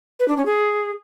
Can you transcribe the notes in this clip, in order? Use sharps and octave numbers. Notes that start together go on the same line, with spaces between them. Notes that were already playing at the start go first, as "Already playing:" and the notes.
B4
D4
C#4
G#4